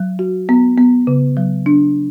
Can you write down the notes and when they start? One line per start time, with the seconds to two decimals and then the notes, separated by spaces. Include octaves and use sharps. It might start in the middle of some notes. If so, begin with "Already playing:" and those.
Already playing: F#3
0.19 F#4
0.49 B3
0.78 B3
1.07 C#3
1.37 F#3
1.66 D4